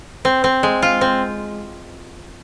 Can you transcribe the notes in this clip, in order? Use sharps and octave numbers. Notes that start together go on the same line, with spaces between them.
C4
C4
G#3
F4
C4